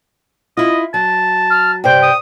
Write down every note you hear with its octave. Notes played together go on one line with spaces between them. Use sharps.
E4 F4 D#5
F#3 A5
F6
G2 C3 C5 G5
D#6